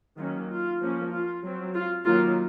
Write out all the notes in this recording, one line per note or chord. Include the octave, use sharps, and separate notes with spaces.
D#3 F#3 A#3 C#4 F4
F4
F3 A#3 C#4
F4
F#3 C4
F4
D#3 F#3 A#3 F4